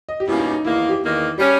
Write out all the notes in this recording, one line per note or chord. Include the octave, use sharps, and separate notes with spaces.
D#5
G4
B2 G3 A#3 C#4 E4
D#4
D#4
E2 D#3 A#3 E4
E4
G4
E2 D#3 A#3
G3 C#4 G4